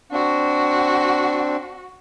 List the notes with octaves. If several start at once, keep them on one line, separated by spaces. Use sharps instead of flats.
C4 D4 F#4